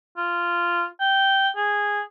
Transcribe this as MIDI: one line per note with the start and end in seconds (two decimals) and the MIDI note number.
0.17 0.85 65
1.00 1.48 79
1.56 2.01 68